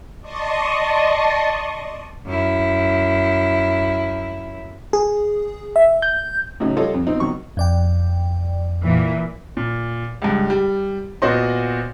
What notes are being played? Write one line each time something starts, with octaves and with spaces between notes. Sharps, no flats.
D5 D#5 A5 C6 C#6 D#6
F#2 E4
G#4
E5
G6
A2 C#3 F#3 D#4
G3 F4 A4 C#5 D#5
F2
B2 C4 D#4
B2 D#3 F#3 C#6
F2 D5 G5
A#2 E3
A#2
C#2 G2
G3
A#2 B3 F#4 C5 D#5 C6